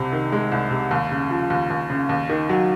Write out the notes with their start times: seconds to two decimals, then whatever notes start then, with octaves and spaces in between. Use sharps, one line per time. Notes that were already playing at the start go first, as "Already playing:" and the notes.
Already playing: C2 C3
0.13 D#3
0.32 G#3
0.52 C2
0.71 C3
0.91 D#2
1.11 C#3
1.31 F3
1.50 D#2
1.70 D#2
1.90 C#3
2.09 D#2
2.29 D#3
2.49 F#3